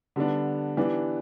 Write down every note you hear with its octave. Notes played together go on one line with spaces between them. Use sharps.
D3 G3 B3 D4
E3 B3 D4 G4